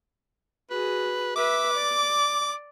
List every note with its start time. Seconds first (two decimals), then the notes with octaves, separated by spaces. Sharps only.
0.70 F#4 G#4 B4
1.36 B4 E5 D6
1.74 D5